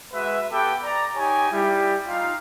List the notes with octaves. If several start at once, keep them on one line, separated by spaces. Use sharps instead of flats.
G#3 F#4 B4 E5
B3 G4 A4 B4 G5 D6
D5 A#5
D#4 G4 C#5 G#5
G3 E4 G4
D#4 F4 F5